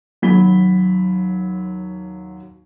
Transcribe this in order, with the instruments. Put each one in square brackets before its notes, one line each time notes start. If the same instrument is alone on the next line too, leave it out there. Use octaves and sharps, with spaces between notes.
[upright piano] D#2 F#3 B5 B6 G7